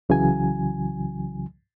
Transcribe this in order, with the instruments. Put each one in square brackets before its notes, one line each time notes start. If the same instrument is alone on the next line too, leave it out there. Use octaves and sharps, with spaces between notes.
[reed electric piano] C2 C#3 E3 F#3 G#5